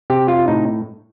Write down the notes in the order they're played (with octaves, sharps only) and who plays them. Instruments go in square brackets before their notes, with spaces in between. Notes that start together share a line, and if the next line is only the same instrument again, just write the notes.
[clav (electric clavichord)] C3 G4
F4
A2 D#4